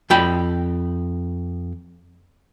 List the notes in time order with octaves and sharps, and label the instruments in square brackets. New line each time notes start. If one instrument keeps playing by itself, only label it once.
[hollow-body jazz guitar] F2 G5 B5